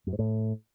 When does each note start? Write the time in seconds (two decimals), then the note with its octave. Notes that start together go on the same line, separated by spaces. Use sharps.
0.07 F#2
0.13 G#2
0.19 A2